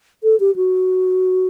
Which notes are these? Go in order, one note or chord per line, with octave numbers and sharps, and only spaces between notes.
A4
G4
F#4